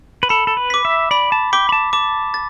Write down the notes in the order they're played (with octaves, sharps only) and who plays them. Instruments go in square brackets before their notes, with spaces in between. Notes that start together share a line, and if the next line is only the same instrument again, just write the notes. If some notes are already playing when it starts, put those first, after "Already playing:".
[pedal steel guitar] B4
[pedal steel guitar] A4 [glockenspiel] B5
[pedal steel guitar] A4
B4
[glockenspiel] D6 B6
[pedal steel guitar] E5
[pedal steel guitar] D5 [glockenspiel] B5
[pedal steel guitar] A5
[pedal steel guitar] G5 [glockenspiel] D6 B6
[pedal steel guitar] B5
A5
[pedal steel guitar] A5 [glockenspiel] D6
[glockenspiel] A6